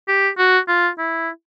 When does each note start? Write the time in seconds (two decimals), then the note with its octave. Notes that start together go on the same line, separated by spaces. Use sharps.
0.08 G4
0.38 F#4
0.68 F4
0.98 E4